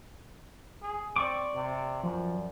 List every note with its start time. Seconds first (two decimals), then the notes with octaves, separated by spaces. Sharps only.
0.82 G#4
1.16 C4 D5 C#6 D6
1.55 C3
2.03 F#2 F3